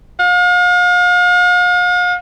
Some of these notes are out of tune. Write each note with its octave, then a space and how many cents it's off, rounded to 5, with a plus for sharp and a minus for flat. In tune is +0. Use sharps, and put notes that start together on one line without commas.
F5 +40